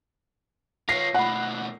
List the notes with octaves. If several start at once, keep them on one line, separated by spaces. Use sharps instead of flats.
F4 C#5 A#6 C7
B2 A3 F#5 B5